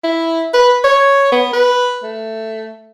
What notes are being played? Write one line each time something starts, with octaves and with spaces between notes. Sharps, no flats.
E4
B4
C#5
B3
B4
A3